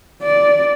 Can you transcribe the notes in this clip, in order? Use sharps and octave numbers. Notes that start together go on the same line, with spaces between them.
D5